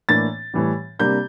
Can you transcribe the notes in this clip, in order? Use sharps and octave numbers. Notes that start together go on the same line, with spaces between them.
A2 E3 A#3 D4 A6
A2 E3 G3
C3 G3 A#3 D4 G6